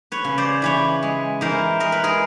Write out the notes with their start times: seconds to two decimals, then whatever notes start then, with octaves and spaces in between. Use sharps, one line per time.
0.12 B4 C#5
0.25 C#3
0.38 C5 D5
0.62 E3 B4 C#5
1.03 G#3
1.41 E3 A#4 C5
1.80 G#3 A#4
1.92 B4
2.04 G#4 A#4